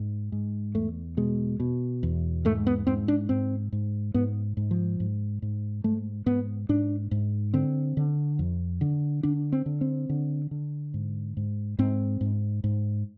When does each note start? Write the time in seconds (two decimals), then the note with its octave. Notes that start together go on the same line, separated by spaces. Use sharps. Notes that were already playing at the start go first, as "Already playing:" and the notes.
Already playing: G#2
0.32 G#2
0.74 E2 A3
1.17 B2 G#3
1.60 B2
2.03 E2
2.45 G#2 A3
2.67 B3
2.87 G#2 C4
3.08 D4
3.29 G#2 C4
3.72 G#2
4.14 G#2 B3
4.57 G#2
4.71 F3
5.00 G#2
5.42 G#2
5.84 G#2 A3
6.26 G#2 B3
6.69 G#2 D4
7.11 G#2
7.54 D3 C4
7.97 D3
8.39 F2
8.81 D3
9.23 D3 D4
9.52 C4
9.66 D3
9.81 C4
10.09 D3
10.51 D3
10.94 G#2
11.37 G#2
11.79 G#2 C4
12.21 G#2
12.64 G#2